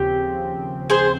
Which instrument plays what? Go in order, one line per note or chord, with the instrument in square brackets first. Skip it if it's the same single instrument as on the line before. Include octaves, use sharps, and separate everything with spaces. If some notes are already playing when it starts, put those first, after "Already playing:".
Already playing: [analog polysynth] D#2 C#3 F3 C4 [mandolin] G4
[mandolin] G#4 C5